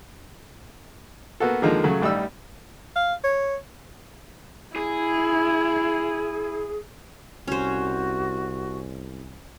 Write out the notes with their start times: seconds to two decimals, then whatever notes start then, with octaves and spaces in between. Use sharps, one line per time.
1.40 A#3 B3 F#4 A4
1.62 D3 D#3 F3 G#3 A#3
1.84 C#3 F#3 A3
2.02 A1 G3 D#4 E6
2.96 F5
3.24 C#5
4.76 E4 G#4
7.47 C2 C#4 F#4 C5